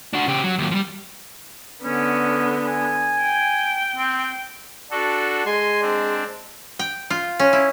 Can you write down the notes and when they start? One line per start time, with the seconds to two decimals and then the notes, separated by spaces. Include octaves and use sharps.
0.13 D4 F#4
0.27 C#3 G4
0.44 F#3
0.58 D#2 F#3
0.71 F3 G3
1.84 D3 B3 C#4
2.67 G#5
3.23 G5
3.96 C4
4.91 D4 F#4 A4
5.46 G#3 G#5 C6
5.81 C4 D4
6.79 G5
7.10 F4
7.39 C#4
7.53 E4